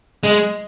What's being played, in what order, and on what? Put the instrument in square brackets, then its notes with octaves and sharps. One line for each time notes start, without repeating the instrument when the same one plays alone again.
[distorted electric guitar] G#3 [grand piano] D#5